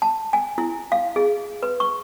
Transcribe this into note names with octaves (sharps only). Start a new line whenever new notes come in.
A5
G#5
E4
F5
G#4
B4
C#6